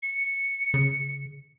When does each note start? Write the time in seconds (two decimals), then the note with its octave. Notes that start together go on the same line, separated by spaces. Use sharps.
0.03 C#7
0.74 C#3